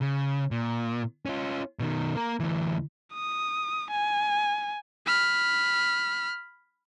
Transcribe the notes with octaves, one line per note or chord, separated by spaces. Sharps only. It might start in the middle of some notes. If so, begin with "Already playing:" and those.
C#3
A#2
C#4 F4
B2 D#3
A#3 A#4
D2 E3
D#6
G#5
B5 F6